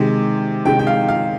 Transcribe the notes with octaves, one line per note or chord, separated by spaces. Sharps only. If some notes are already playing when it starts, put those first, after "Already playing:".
Already playing: C3 D#3 G#3
C3 D#3 G#3 G5
G5
F5
F5